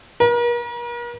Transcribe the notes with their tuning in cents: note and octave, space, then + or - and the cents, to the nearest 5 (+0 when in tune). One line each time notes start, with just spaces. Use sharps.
A#4 +40